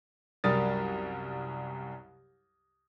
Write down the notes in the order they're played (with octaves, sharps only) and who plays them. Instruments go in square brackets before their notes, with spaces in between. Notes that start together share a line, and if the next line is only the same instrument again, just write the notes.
[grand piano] C2 F#2 G3 A#4 D#6 A6